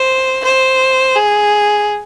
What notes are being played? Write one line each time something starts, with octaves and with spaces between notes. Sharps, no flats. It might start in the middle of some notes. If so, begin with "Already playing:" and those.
Already playing: C5
C5
G#4